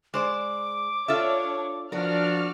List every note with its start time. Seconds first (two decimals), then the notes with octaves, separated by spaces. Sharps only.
0.14 G#3 C5 D5 D6
1.08 D4 F4 A4 C#5 E5
1.92 F3 B3 D4 F#4 A#4 D5 F6